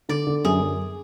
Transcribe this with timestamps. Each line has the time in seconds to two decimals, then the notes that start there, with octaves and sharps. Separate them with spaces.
0.09 D3 D5
0.27 D3
0.44 F#2 G#4
0.61 F#2